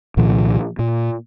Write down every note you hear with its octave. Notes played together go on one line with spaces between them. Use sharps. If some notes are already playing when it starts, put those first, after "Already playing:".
C2 A#2 D#3 F3
A#2